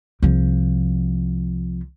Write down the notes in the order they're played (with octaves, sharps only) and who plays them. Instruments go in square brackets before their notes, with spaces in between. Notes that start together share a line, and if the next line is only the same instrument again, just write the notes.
[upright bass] C2 F3